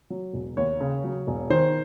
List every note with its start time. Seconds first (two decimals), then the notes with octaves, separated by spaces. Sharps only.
0.10 F#3
0.33 E1
0.57 D#2 C#5
0.81 C#3
1.04 F#3
1.27 E1
1.50 D#3 C5